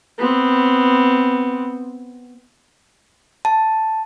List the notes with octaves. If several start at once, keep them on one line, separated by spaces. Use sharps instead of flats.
B3 C4
A5